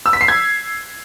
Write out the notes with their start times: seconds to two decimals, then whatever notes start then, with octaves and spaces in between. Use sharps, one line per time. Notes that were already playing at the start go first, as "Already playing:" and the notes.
0.06 E6
0.13 B6
0.21 C7
0.28 G#6